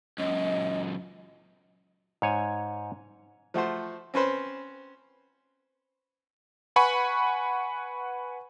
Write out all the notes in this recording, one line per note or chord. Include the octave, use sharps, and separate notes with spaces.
C#2 F#2 D#5
G#2 C#5 G#5
F3 A3 F#4 C5
C4 C#4 B4 C5
B4 F#5 G#5 B5 C#6